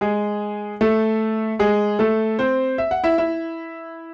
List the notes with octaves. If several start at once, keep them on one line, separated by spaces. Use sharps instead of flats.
G#3 G#4
A3 A4
G#3 G#4
A3 A4
C4 C5
E5
F#5
E4 E5
E4 E5